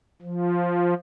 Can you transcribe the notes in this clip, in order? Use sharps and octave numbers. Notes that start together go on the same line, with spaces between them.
F3